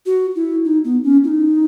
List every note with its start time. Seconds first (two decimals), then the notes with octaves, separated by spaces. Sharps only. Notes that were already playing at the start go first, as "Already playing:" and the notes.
0.06 F#4
0.36 E4
0.65 D#4
0.84 B3
1.04 C#4
1.24 E4
1.28 D#4